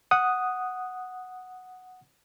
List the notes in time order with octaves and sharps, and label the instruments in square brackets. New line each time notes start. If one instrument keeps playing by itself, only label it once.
[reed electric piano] F#5 D#6